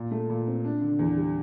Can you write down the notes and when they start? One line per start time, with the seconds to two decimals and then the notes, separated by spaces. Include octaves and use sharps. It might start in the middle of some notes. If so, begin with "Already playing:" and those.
Already playing: A#2
0.11 A3
0.30 A#2
0.47 C4
0.65 D4
0.82 D3
0.99 E2
1.17 G3